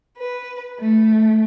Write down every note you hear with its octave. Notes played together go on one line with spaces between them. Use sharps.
B4
A3